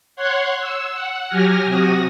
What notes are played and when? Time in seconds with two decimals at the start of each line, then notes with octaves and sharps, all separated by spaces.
0.16 C#5 F#5 C6 F#6 G#6
0.59 E6
0.92 F#5
1.28 F#3 G4 G#5 F6 A#6
1.66 C3 F#4 D#6 A#6